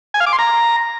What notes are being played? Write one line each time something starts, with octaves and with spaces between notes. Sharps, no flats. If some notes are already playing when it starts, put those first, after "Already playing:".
G#5
F5
D6
C6
A#5